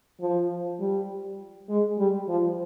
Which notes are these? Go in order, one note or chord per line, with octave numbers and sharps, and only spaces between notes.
F3
G3
G#3
G3
F3